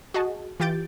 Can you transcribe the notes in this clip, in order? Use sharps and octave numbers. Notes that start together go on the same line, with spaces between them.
F#4 G#4 D#5 A5
E3 F4 G4 G6 A6 D7